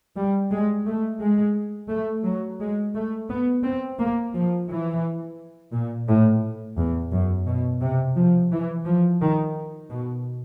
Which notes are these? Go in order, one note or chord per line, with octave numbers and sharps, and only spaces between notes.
G3
G#3
A3
G#3
A3
F#3
G#3
A3
B3
C4
A#3
F3
E3
A#2
A2
E2
F#2
B2
C3
F3
E3
F3
D#3
B2